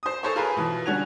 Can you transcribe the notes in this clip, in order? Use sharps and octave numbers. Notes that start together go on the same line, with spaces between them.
C5 D#6
A4 C5 C#5
F4 G#4 A#4 B4
B2 E3
D3 G3 C#4 F#5 G#6 F7